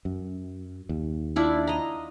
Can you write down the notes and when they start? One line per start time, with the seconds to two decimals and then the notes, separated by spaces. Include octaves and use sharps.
0.05 F#2
0.89 D#2
1.36 D4 E4 F4
1.67 D#5 A#5